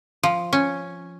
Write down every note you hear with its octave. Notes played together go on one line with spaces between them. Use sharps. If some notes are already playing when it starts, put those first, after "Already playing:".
F3
C#4